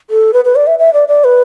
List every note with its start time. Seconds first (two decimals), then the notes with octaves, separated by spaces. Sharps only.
0.10 A4
0.33 B4
0.45 B4
0.56 D5
0.67 E5
0.79 E5
0.93 D5
1.08 D5
1.24 B4